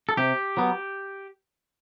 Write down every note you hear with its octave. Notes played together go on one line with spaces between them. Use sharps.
A4
C3 G4
F#3 B3